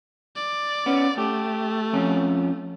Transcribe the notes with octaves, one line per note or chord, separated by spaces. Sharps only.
D5
B3 C#4
A3 G4
F2 C#4